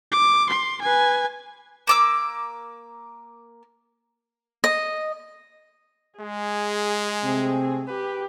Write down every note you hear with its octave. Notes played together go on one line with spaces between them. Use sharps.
D6
C6
B4 G#5
A#3 D6 E6
D#5
G#3 G#4
C3 A3 C4
G4 B4